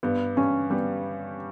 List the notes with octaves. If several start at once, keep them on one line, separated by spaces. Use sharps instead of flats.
G2 B3
G2 C#4
G3 B3